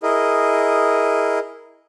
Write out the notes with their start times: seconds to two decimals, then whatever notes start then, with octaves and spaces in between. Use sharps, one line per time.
0.03 E4 G#4 A#4 D#5